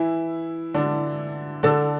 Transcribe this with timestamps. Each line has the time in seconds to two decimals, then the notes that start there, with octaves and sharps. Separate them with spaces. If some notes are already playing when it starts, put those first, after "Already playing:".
Already playing: E3 E4
0.74 D3 D4
1.63 D3 D4 A4